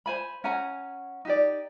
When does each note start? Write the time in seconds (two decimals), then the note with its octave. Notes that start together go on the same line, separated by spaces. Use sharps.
0.06 C5 G#5 B5
0.44 C#4 F#5 G#5 A#5
1.25 D#4 G4 D5